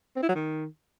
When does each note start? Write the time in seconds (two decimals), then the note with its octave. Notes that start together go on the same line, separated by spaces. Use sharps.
0.16 C4
0.23 E4
0.29 F#3
0.35 D#3